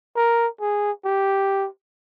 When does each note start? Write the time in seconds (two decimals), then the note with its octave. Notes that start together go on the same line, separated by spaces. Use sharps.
0.16 A#4
0.61 G#4
1.05 G4